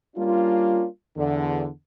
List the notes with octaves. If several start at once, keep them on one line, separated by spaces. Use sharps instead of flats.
G3 A#3 C#4 D4 F4
E2 D3